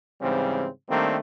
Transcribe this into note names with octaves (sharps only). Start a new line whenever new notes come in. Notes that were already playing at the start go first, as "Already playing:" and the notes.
G#2 C#3 E3 G3 C4
D#3 G3 A3 A#3 C4 D4